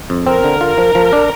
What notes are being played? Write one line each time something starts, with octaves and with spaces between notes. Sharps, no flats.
F2
C4 A#4
D3
F4
F3
F3
D4